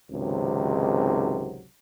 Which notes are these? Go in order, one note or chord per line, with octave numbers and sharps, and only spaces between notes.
G#1 C#2 C3 D#3 F#3